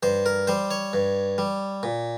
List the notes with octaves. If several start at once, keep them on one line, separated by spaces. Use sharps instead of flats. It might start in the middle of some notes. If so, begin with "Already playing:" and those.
G2 C5
A#4
G3 C5
C#5
G2
G3
A#2